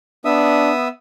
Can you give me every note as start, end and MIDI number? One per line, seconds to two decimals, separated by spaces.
0.25 0.88 59
0.25 0.71 62
0.25 0.88 76
0.25 0.88 87